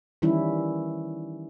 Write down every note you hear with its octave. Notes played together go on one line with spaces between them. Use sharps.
D#3 E3 G3 C#4 E4